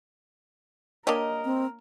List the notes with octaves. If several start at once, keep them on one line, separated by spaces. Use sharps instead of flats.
A#3 D4 G4 A#4 C#5 D#5
C4